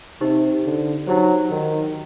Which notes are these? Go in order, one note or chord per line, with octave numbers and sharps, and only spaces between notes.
C3 D#4 G4 C5
D3
F#3 D#4 G4 C5
D#3